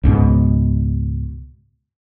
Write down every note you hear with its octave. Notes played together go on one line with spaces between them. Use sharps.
C#2 G#2 B2